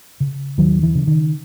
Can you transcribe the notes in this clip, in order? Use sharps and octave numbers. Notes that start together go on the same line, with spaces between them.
C#3
D#2 D#3 F#3
E3
C#3
D#3